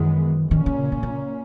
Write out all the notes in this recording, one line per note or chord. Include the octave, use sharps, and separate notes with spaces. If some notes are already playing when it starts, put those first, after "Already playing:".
Already playing: F#2 D#3 E3 G#3 B3
A#2 D#3 A#3 C#4
C#3
C#3
C#3